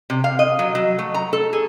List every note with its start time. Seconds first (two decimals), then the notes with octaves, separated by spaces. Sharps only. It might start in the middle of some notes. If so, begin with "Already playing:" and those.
0.10 C3
0.24 F5
0.39 D#5
0.59 F#3
0.75 F#3
0.99 A3
1.14 A#5
1.33 A4
1.53 G#4